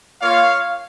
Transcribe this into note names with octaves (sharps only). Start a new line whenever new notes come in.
A#3 F4 C#5 F5